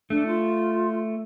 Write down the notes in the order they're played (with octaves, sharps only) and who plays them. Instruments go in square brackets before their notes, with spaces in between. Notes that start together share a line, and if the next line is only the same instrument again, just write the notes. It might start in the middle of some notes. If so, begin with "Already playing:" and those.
[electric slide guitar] A3 [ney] D4
[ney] F4